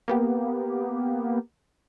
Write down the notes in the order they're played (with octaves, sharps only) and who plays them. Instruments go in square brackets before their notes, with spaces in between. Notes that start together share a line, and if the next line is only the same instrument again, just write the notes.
[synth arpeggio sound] A#3 B3 G4